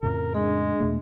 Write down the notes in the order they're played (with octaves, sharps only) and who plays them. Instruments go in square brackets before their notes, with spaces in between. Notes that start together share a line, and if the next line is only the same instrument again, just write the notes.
[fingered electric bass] F2 A2 C#3 [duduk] A#4
[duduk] G#3 [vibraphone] D4 G#4
[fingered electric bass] E2 B2 A3